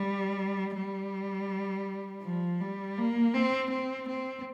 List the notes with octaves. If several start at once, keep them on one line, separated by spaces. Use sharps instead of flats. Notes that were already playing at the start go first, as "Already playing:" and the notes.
Already playing: G3
G3
F3
G3
A#3
C4
C4
C4